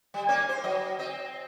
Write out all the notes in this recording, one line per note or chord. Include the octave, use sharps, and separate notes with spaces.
G3
A#3 C#4
C5
F#3 D#5
C4 D#5